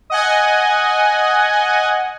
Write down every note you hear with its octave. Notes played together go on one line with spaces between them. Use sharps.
D#5 F#5 G#5